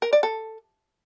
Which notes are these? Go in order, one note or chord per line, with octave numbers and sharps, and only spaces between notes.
A#4
D5
A4